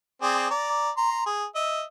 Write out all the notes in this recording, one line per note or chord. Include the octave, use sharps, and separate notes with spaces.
C4 G#4 D5
D5 A#5
A#5 C6
G#4
D#5 E5